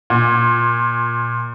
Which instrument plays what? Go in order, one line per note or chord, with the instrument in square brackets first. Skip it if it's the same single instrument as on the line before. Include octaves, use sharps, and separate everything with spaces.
[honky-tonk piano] A#2